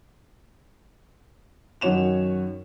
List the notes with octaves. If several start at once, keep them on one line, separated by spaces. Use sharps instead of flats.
F#2 D#3 F#4 C#5 E7 F7